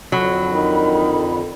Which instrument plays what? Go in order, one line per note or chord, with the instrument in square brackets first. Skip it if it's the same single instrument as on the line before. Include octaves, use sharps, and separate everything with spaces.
[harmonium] F2 D3 [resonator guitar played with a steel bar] F#3 [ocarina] B5
[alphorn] D#3